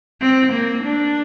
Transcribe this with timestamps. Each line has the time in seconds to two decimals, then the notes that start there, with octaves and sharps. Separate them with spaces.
0.21 C4
0.53 A#3
0.84 D4